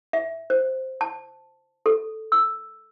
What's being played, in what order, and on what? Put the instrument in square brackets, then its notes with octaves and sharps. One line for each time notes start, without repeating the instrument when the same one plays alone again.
[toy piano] E5
C5
A5
A4
E6